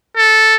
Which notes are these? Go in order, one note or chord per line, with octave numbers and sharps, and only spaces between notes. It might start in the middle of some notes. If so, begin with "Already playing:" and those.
A4